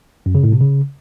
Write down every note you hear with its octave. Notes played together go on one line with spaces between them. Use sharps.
F#2
C#3
A2
C3
C#3